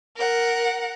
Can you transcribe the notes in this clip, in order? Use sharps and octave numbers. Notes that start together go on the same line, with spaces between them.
A#4 F#5